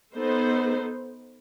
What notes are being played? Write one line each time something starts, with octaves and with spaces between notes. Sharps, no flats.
B3 D#4 A4 C5